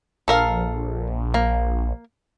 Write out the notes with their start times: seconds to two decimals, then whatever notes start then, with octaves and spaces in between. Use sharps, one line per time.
0.28 A#1 A4 A#4 F5
1.34 A#3